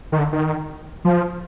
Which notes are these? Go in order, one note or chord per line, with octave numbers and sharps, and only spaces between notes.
D#3
D3
D#3
F3